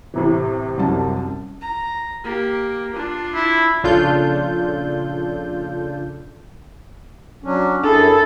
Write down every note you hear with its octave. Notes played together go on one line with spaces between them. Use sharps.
A2 C3 E3
C2 F#2 A5
A#5
A#3 G4
D4 F4
E4
A#1 C#3 D4 F4 A4 G6
F#3 C#4 D4
F#2 D4 E4 G#4 A4